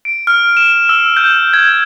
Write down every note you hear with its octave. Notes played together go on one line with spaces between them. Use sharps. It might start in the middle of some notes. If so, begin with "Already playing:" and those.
D7
F6
E7
E6
G6
G#6